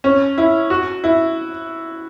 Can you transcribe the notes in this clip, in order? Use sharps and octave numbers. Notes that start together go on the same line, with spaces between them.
C#4
E4
F#4
E4